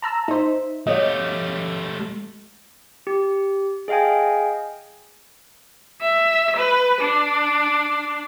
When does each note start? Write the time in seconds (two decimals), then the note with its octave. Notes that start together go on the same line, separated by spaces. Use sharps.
0.02 A5 A#5 E6
0.28 D#4 C5 E5
0.87 A3 F#4 G4 C#5 D#5 F5
3.07 G4
3.88 G#4 D#5 F5 G5 G#5
6.02 E5
6.57 B4
7.01 D4